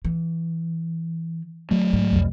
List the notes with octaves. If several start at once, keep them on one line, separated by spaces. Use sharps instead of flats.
E3
F#3 A3
G#2
C2 F2